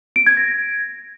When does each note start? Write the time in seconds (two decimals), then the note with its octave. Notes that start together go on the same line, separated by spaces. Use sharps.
0.16 D7
0.26 G#6
0.37 A#6